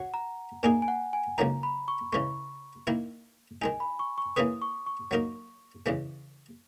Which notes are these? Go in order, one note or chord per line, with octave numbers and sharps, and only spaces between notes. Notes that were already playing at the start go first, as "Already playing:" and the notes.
Already playing: F#4 C#5 F#5
A#5
A#2 A#3 D#4 G#4 G#5
G#5
F#5
G#5
C#2 C#3 F#3 A#3 D#4 A#5
B5
C#6
C#3 E3 G#3 C#6
D#3 A#3 E4
D#3 G#3 D#4 G#5
B5
C#6
C#6
E3 A#3 C#4 G#4 B4 D#6
C#6
C#6
F#3 A#3 D#4 A#4
E2 C#3 E3 G#3